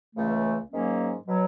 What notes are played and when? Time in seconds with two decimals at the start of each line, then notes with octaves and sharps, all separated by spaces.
0.15 C#2 C#3 E3 A3
0.71 G#2 D#3 F#3 A#3 C#4
1.27 B2 F#3